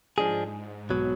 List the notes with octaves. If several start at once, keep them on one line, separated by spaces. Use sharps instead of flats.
G#2 F3 G#3 D4 G#4
B1 B2 F#3